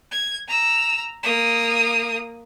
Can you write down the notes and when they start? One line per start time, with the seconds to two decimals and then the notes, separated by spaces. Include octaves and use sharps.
0.12 G#6
0.48 A#5 E6
1.23 A#3 D#6